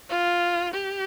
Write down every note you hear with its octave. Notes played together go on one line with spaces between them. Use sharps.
F4
G4